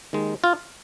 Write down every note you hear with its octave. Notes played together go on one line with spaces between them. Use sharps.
D#2 D#3 G#3
F4